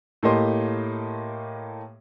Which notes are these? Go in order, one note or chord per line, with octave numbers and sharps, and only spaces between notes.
A2 A3 A#3 G4 D#5 C6